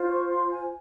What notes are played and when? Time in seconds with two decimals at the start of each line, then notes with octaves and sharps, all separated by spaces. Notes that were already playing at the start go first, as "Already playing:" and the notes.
Already playing: F4 C5
0.08 C#6
0.29 C6
0.50 G#5